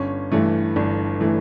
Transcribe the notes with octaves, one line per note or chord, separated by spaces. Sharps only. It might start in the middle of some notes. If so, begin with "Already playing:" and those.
Already playing: G1 C#4
G2 E3 A3
G1 D4
E3 A3